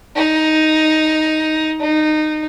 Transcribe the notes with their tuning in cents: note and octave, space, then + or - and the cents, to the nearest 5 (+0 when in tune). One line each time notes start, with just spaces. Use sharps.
D#4 +5
D#4 -15